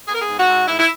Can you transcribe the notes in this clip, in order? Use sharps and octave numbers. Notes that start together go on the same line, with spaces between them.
B3 G#4
A#4
G#4
G#2
F#4
G#2
G#2 E4
E4